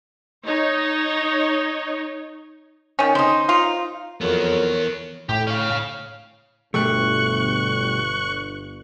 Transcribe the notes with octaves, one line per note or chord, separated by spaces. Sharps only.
D#4 C#5
D#3 C#4
D#4 C5
F4
F2 E3 F#3 B3 A#4 C#5
A2 G4
C#4 F5
G1 B2 G3 A3 C#6 F#6